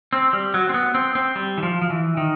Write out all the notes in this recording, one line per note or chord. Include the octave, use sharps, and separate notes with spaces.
C4
G3
F#3
C4
B3
C4
C4
G3
E3
F3
F3
E3
D#3